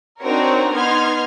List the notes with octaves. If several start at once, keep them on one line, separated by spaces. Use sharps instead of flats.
C4 D4 D#4 F#4 A#4 C#5
B3 D#4 C6 F6 G#6